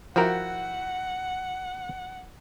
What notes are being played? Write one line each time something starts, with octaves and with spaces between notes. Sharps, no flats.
F3 E4 F#4 A#4 F#5 G5